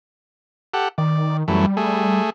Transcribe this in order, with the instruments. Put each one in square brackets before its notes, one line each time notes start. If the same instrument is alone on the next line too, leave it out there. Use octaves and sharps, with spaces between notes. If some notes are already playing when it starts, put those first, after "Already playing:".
[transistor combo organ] G4 A4 F#5
[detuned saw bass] D#3 [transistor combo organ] D5
[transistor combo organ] F#2 E3 A3 [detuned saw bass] G3
[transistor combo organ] A3 G#4